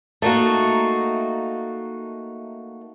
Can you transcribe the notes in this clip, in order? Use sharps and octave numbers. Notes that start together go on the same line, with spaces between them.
A3 A#3 D#4 F#4